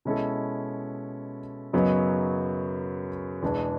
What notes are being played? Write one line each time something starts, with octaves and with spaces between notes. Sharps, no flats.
B2 G#3 C#4 E4 A4
F#2 C#3 F#3 B3 D#4
E2 B2 G#3 B3 D4